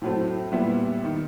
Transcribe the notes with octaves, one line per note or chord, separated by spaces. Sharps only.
A2 F#3 A3 C4
A#2 G3 B3 E4
D#3